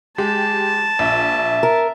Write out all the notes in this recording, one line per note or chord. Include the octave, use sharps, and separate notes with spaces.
G#3 G4 A5
A#1 E5
A#4